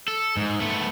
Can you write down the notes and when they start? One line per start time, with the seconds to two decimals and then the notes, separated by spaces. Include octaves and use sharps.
0.08 A4
0.37 G#2
0.60 A3 B3